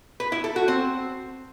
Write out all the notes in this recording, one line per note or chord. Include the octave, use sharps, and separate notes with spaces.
B4
E4
A4
F#4
C4